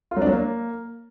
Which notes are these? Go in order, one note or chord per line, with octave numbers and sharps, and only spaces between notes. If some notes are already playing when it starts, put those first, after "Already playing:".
F4
F#3
D4
F#3
A#3